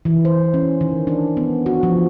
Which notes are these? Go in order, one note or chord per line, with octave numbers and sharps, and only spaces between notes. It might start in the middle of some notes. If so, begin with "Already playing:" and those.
E3
C5
C#4
D#3
D4
B3
F#4
F3